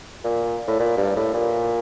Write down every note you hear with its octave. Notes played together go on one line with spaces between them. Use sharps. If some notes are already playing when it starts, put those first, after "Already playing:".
A#2
A2
A#2
G2
A2
A#2